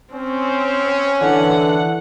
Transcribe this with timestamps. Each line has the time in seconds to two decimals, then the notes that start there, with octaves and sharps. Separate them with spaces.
0.13 C4 C#4
1.21 D3 E3 F#5